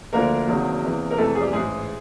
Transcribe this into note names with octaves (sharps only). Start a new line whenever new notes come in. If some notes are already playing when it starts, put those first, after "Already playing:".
D2 D3 F3 A#3 A#4
E1 E2 C3 D#3 F#3
E2 C3 E3
A#4
F1 E2 C3 E3 A3 A4
G#4
G3 G4
A1 G#2 E3 G#3 G#4